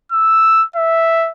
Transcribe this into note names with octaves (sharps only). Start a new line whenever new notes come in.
E6
E5